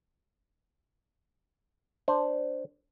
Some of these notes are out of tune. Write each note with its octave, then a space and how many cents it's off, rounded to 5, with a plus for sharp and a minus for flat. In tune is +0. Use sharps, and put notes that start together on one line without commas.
D4 +0 C5 +0